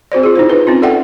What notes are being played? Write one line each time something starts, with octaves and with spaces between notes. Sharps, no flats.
C4 F#4 C5 D5
F4 G#4
D#4 E4 C5
D#4 F4 B4
C4 C#4 F4
A4 D5 E5 F#5 G5